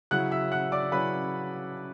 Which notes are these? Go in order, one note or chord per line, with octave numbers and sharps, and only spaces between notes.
C#3 F#3 C#4 E4 F#5 F#6
E5 E6
F#5 F#6
D5 D6
C#3 F#3 C#4 E4 B4 B5